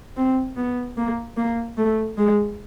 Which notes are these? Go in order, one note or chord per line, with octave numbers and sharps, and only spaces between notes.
C4
B3
A#3
A#3
A3
G#3